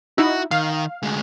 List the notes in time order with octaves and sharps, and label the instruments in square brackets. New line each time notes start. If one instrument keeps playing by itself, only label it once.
[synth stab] D#4 E4 [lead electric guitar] F#4
[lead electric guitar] D#3 [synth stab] F5
[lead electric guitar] D2 G#3